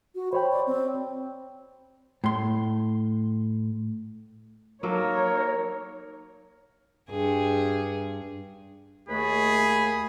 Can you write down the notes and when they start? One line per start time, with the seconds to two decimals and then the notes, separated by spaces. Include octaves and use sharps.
0.15 F#4
0.33 C5 C#5 G5 B5
0.52 D5
0.67 C4
2.24 A2 C6
4.83 F#3 A#3 D#4 A4 A#4 C#5
7.10 G2 G#4
9.09 D#2 A3 G#4 B5